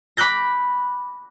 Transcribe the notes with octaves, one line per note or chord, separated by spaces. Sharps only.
B5 D6 F#6 G6 A#6